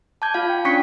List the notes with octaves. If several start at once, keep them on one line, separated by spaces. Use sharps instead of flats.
A5 D6 G6 G#6
F4 F5
G5
C#4 D4 C#6 B6 C#7